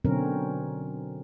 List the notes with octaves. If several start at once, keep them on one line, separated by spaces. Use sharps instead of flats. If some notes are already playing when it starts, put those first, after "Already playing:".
B2 D3 F#3 C4 C#4 A#4